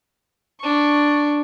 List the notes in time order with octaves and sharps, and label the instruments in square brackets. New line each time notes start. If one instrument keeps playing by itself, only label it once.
[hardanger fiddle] D4 C#6